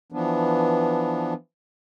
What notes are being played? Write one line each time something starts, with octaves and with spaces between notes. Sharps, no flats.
E3 F3 B3 D4